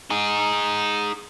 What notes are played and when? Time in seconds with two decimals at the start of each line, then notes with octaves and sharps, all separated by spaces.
0.10 D#4 G#4